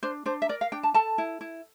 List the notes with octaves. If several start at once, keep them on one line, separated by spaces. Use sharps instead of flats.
D4 C5
D4 C5
E5
A#4 D5
F5
D4 G5
A5
A4 A5
E4
E4